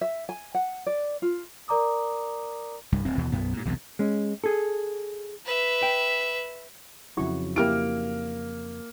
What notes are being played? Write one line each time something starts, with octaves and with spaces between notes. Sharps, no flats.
E5
G#5
F#5
D5
F4
A#4 D5 A#5 D6 D#6
C2 G2
D1 C4
D#2 B2 E3
B1 F#2 B3
G2 A#2
B1 E2 G2 C3
G#3 C#4
G#4 A4
B4 E5
G5
F2 C#3 F#3 E4 F#4 C#6
A#3 E4 G4 F6 D7